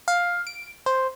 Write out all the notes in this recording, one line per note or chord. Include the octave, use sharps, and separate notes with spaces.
F5
D7
C5